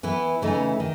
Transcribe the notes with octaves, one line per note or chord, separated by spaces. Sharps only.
E3 B3 E4
C#3 E3 A3 D#4
D#3